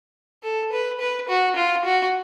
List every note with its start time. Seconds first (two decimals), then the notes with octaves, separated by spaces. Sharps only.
0.43 A4
0.72 B4
1.00 B4
1.29 F#4
1.56 F4
1.85 F#4